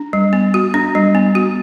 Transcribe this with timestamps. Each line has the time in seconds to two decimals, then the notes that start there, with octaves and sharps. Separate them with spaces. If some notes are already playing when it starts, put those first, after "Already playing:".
Already playing: D4
0.13 G3
0.33 B3
0.54 F#4
0.74 D4
0.95 G3
1.15 B3
1.35 F#4